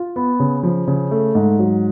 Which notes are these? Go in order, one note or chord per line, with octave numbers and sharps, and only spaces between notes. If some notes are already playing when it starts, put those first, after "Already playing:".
Already playing: F4
B3
C#3
F3
C#3
A3
G#2
F#3